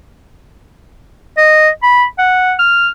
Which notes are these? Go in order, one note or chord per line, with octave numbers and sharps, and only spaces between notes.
D#5
B5
F#5
F6